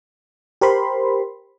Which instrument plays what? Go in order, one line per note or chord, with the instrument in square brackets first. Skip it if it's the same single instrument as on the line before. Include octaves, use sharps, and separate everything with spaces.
[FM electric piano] G4 A#4 C5 B5 C6